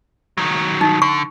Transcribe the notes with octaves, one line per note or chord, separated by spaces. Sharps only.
D#3 F#3
D#4
D3 C#6